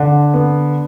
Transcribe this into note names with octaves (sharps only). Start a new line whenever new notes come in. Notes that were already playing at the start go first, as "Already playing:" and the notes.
Already playing: D3
B3